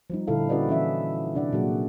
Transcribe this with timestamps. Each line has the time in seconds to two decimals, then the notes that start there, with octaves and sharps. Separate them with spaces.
0.10 F3 G3 D#4
0.27 A#2 D3 E4 A4 F5
0.49 C#4 E4 F#4 B4 D5 D#5
0.69 E3 C#4 E5
1.34 C3 D4 D5 F#5
1.53 A#2 F#3 A#3 F#4 G#4